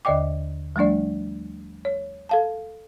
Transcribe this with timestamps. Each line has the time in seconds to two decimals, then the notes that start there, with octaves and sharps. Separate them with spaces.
0.05 D#2 D3 D5 D#5 G5 D6
0.76 F3 G3 A3 D4 D5
1.85 C#5
2.29 A4 F5 A5